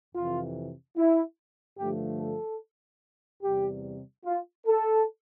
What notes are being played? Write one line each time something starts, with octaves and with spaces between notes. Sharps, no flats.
F2 C3 E3 F4
E4
G2 D3 F3 A3 G4
A4
E2 C3 G3 G4
F4
A4